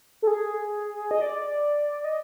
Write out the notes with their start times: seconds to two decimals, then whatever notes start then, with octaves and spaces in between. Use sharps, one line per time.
0.22 A4
0.27 G#4
1.11 D#5
1.21 D5
2.04 D#5